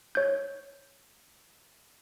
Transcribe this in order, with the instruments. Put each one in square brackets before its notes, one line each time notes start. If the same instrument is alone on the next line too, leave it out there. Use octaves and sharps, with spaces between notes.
[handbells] C#5 G6